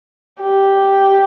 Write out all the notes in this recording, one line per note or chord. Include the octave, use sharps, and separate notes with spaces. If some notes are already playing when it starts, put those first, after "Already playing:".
G4